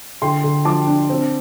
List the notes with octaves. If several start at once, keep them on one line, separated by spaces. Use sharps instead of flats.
D3 G5 C6
D3
F3 A5 D6
D4
C4